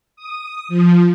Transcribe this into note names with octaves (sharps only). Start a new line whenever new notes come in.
D#6
F3